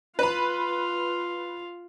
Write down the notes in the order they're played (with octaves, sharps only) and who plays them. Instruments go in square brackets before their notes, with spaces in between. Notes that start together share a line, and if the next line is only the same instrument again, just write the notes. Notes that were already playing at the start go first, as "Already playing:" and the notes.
[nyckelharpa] F4 F5 [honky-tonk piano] B4 B5